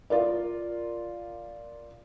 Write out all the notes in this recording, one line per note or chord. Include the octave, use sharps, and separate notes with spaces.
F4 A#4 D5